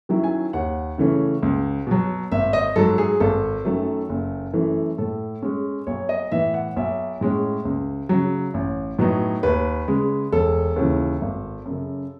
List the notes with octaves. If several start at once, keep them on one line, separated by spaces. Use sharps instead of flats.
D#3 F#3 C#4 E4
G#5
D#2 F#5
C#3 E3 A3 C#4
C#2
B2 F#3
G#1 E5
D#5
G#2 F#3 A4
G#4
G#1 A4
F#2 D#3 F#3 A3
F#1
F#2 E3 A3
A2 A4
G#3 C#4
B1 C#5
D#5
A2 E3 B3 E4 E5
F#5
B1 E5
A2 G#3 C#4
C#2
C#3 F#3
A1
A2 F#3 B3 D#4
D#2 B4
C#3 G#3
E1 A4
D#2 C#3 E3
G#1
F#2
C#3